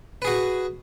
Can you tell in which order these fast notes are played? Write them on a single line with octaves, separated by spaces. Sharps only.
B4 G#4 F#4